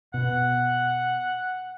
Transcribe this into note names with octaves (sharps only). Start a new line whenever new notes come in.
B2 F#5